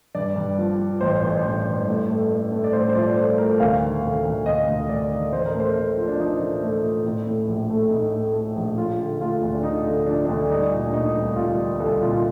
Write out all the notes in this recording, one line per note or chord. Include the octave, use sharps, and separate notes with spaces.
G2 D5
G2
F3
F3
A1 C5
A1
A1
G2
A2
A3
A3
A3
D5
A2 C5
C5
F3 D5
A3 C5
A3 A#4
D2 F5
D#3
D2
D2
D2 D#5
D2
D2 D5
D#3
A1 C5
A#4
A3
C5
A3
F3
D4
F3 D#4
F3
A3
A3
A2
A2
A#1
A3
A2 D#4
A3
A3
A#1
F3 F4
D3
A3 F4
D2
D4
D3 D#4
D3
F3 D4
D4
D2
G3 D#4
A#2
D4
A#2 D#4
C2
G3 F4
G3
C2 A4
A#2 F4
F4